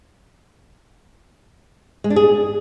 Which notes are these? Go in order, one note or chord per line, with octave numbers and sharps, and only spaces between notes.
G#3
D4
G#4